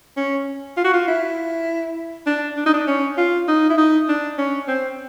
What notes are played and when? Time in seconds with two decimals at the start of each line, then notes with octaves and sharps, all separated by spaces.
0.17 C#4
0.77 F4
0.84 F#4
0.93 F4
1.07 E4
2.27 D4
2.57 D4
2.66 D#4
2.74 D4
2.87 C#4
3.18 F4
3.48 D#4
3.70 E4
3.77 D#4
4.08 D4
4.38 C#4
4.68 C4